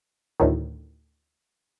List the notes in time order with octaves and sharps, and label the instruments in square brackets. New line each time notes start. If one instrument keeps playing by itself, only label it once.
[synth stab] D2 A2 D#3